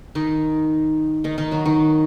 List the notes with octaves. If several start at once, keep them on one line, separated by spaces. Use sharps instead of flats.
D#3 D#4
D#3 D#4
D#3 D#4
F#3 F#4
D#3 D#4